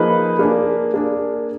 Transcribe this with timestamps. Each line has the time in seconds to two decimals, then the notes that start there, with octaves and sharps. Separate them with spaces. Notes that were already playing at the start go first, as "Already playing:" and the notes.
Already playing: F3 A#3 D#4 G#4 B4
0.39 A#3 D4 G#4
0.94 A#3 D4 G#4